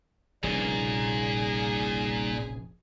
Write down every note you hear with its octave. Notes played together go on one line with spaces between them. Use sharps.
F1 A#1 A#2 C#3 G3 D#4 G#4